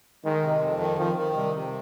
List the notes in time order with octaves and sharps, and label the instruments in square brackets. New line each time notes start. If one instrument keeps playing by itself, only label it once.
[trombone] D#3 [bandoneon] G#3
[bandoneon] C3
F2
D#3
[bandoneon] D#3 [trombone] F3
[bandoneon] D#3
[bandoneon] C3 [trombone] G3
[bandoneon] C3